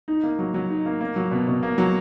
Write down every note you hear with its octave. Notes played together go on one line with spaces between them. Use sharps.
D#4
A#3
F#3
F#3
D#4
A#3
A#3
F#3
B2
B2
A#3
F#3